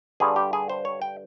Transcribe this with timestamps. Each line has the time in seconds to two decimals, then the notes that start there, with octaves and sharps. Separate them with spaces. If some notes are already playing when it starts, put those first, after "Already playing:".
0.20 G2 D3 G3 G#4
0.36 G4
0.53 G#4
0.70 C5
0.85 C#5
1.02 G5